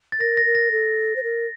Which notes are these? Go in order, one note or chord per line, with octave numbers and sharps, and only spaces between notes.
A6
A#4 A#6
A#6
A#4
A#6
A4
C5
A#4